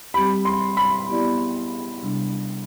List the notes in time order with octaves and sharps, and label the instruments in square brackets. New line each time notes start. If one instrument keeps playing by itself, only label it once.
[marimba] G3 C4 G4 [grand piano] B5
[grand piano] C6
B5
[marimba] B3 E4 G4 D5
C3 G3 D4